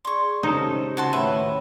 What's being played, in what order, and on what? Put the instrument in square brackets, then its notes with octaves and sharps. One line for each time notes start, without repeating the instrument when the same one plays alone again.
[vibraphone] G#4 D5 [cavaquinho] C6 C#6
[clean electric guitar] C#2 C#4 A4 [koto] D#4 [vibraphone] G4 C5 D#5
[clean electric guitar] C#3 [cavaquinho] F#4 A5 C6
[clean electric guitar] D#2 A2 B4 [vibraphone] C#5 G5 B5 [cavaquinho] E5